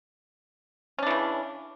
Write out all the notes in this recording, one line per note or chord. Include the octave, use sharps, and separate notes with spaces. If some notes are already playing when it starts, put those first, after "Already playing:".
C#3 E3 C#4 D4